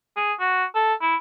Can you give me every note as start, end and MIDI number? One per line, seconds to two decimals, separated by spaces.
0.16 0.33 68
0.40 0.65 66
0.75 0.94 69
1.01 1.16 64